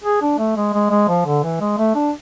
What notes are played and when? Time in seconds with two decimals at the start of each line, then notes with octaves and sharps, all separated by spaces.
0.04 G#4
0.22 D4
0.38 A3
0.57 G#3
0.74 G#3
0.90 G#3
1.08 F3
1.26 D3
1.43 E3
1.60 G#3
1.78 A3
1.95 D4